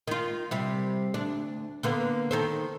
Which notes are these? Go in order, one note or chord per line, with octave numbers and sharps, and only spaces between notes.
D#3 F4
C3 G3
D2 D4
D3 A#3 B3
D#3 A4 C5